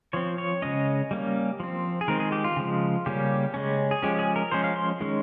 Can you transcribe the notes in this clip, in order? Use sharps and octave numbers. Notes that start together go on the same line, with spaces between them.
F3 C4 C#5
C#5
C#3 G#3 C#4 D#5
G3 A#3 C#4
F3 C4
G#4
D#3 G#3 C4 A#4
G#4
G4
F4
C#3 F3 G#3
C#3 G3 A#3 C#4 G4
C#3 G#3 C#4
G#4
F3 G#3 C#4 G4
G#4
A#4
F3 G#3 C#4 C5
F5
C6
D#3 G#3 C#4